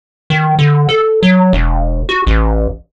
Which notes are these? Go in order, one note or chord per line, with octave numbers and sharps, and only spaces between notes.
D#3
D3
A4
F#3
E1
F#4
A1